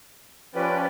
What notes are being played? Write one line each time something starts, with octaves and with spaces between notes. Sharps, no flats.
F3 C#4 G4 B4 D5